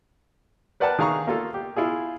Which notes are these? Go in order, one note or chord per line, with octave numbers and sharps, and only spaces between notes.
A#4 B4 D5 F#5 G5 A5
D#3 G#4 F5 A#5 C#6
A#3 F4 A4
G4
E4 F4 G#4